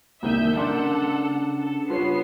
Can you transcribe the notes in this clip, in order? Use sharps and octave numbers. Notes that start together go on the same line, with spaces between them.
C2 D#3 A#3 E5 G6 D#7
C#3 D4 A4 A#4 D5 F#5 C6
A4
G3 B3 F4 B4 C#5 C7